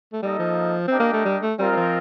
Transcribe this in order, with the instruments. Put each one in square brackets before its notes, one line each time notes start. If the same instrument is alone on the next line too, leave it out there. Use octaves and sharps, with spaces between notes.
[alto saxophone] A3
[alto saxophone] G3 [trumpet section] A#3 D#4 A4 D#5
[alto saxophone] F3
[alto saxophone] C4 [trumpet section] D4 G4 A#4 D#5 G5
[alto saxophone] A#3
A3
G3
A3
[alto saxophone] G3 [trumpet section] C4 F4 A#4 D#5
[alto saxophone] G3
F3